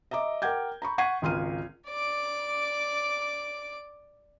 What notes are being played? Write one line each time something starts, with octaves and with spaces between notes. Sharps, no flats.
D#5 E5 A#5 D6
A#4 F#5 G5 D6 G6 G#6
A#5 B5 C#6
F#5 C#6 G#6 B6 C7 D#7
G#1 C#2 C6 F6 D#7
D5 D6